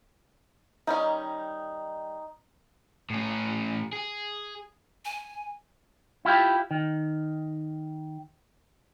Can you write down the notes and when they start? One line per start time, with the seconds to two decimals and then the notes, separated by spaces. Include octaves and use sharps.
0.87 D#3 G3 C#4 D#4
3.10 A2 C#4
3.93 G#4
5.05 G#5
6.25 E4 F4 G4
6.71 D#3